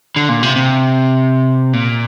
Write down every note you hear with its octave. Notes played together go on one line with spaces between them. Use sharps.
D3
A#2
C3
C3
A#2